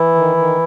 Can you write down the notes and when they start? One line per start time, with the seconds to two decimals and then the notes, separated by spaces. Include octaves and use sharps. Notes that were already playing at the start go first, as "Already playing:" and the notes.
Already playing: E3 E4
0.15 D#3
0.37 D#3